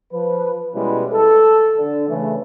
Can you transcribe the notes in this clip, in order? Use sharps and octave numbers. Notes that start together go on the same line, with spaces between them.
F3 B4
B2 G3 G#3 C#4 E4 B4
A4
D3
C#3 E3 A3